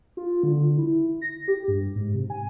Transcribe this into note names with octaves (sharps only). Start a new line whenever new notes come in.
F4
D3
E4
A#6
G4
G2
G#2
C3
G#5